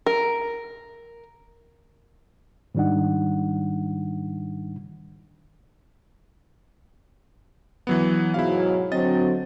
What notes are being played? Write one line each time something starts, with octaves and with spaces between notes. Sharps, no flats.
A#4
G#2 D#3 G3 D4 D#4 F#5
E3 F#3 B3
G#2 B2 F#3 E4 F5
D3 F#3 C4 D#5 A6